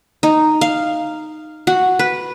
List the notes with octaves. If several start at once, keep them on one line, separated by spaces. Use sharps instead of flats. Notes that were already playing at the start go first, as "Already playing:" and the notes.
D#4
F5
F#4
B4